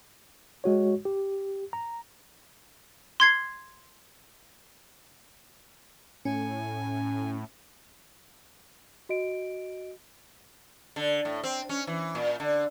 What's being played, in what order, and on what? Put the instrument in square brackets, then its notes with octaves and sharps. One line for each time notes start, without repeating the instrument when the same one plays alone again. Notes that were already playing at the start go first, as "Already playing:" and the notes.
[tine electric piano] G#3 F#4 C#5
G4
A#5
[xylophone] C6 G#6 C7
[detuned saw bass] A2 [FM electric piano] C#4 [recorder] G#5
[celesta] F#4 D#5 D7
[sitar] D3
A2
C4
C#4
E3
A#2
D3